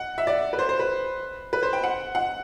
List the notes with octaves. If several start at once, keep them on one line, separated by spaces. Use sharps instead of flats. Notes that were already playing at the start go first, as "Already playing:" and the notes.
Already playing: F#5
E5
D5
B4
C5
C5
B4
B4
C5
G5
F#5
F#5